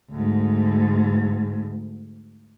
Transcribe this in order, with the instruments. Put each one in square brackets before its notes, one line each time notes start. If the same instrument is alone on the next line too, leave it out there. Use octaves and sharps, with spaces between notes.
[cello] D2 G#2